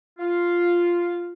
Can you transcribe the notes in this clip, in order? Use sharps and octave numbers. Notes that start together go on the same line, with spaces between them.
F4